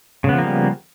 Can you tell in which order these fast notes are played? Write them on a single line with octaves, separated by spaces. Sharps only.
C#3 B3 F3 A#3 G3